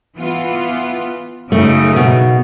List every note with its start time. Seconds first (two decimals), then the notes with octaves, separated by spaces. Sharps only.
0.17 E3 B3 F4
1.52 F#2 C#3 A3 D#4
1.96 B2